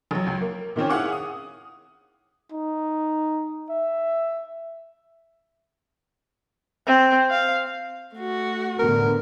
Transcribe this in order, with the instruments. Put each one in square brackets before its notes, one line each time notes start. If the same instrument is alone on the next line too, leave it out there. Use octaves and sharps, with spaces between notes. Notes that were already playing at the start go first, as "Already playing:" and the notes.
[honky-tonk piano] A1 F#3
C#2 F#3
A#3
A#2 D#3 C4 C#4
E4 G#4 F5 F#5 D6
D#6
[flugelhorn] D#4
E5
[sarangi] C4
F5
[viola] A3 F#4
[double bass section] A2 D3 B3 [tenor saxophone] A#4